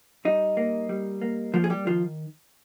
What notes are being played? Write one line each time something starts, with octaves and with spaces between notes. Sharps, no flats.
G3 D#4
A#3
G3
A#3
F3 A#3 F4
G#4
G3 G4
D#3 F3 F4